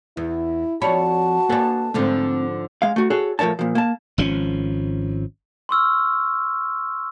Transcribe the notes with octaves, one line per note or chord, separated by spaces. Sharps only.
E2 E4
F2 F#4 C#5 D5 A5 B5
A#3 D4 A4 B4 G#5
G#2 D3 F3 A3 C4
G#3 F5
A3 F#4
F#4 G#4 A4 C#5
A2 F3 A#4 C#5 A5
A#2 F3
A#3 A5
G#1 F3 C4 C#4
C6 C#6 E6 F6